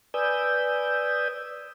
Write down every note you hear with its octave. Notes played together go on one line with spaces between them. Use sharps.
B4 D5 G#5 D#6 E6 G6